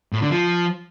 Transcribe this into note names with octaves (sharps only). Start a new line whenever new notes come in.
A2
D3
F3